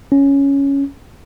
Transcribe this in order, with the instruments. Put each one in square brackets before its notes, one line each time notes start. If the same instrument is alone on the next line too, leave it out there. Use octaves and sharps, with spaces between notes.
[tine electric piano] C#4